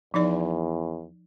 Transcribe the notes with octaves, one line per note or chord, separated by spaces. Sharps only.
E2 F3 D#4 D5